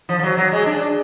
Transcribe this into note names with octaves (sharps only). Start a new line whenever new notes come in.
F3
F3
F#3
F#3
G#3
D4